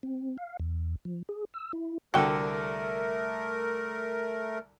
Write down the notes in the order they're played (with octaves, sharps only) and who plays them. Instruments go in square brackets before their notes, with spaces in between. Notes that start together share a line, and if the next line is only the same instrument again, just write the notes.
[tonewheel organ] C4
F5
E2
F3
G#4
E6
E4
[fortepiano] C2 D3 A4 [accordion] A3 A#4 [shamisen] F#4 G5